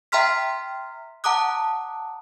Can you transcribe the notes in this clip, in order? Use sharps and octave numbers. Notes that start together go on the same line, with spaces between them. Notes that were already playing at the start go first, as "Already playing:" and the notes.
E5 G5 A#5 C6 F6 B6
F#5 A5 A#5 D6 D#6 F#6